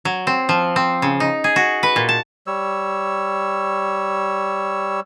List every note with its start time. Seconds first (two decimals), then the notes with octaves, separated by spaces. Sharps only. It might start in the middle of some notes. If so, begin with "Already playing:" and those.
0.05 F#3
0.27 C4
0.49 F3
0.76 C4
1.02 C#3
1.20 D#4
1.44 G#4
1.56 F#4
1.83 B4
1.96 A#2
2.09 A5
2.47 G3 C#5 E6